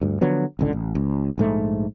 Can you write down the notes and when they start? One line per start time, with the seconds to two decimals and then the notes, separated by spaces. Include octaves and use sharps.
0.02 D2 G2
0.21 D3 F3 F#3 B3
0.59 G#1 C#2 D3
0.73 A1
0.95 C#2
1.38 A#1 G#2 A3